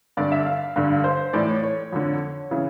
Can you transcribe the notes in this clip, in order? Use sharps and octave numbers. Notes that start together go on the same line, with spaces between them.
G2 D3 D5
E5
F5
G2 D3
C5
A2 E3 D5
C#5
C#5
F2 D3
C#3 E3